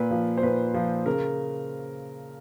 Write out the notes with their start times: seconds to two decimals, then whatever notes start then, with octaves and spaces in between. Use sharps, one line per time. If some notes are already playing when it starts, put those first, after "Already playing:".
Already playing: A#2 B4
0.11 F3
0.37 C5
0.43 A#2 B4
0.74 F3
1.06 C#3 A#4